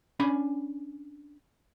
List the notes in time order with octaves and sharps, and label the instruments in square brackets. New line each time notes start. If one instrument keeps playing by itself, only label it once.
[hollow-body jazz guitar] C#4 D4 G#5 B5